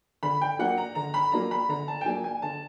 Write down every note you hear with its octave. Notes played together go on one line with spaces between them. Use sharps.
D3 B5
G5
F#3 A#3 D4 F#5
A#5
D3 A#5
B5
F#3 A#3 D4 A#5
B5
D3 A#5
A5
G5
F#3 A#3 D4 G#5
G#5
D3 A5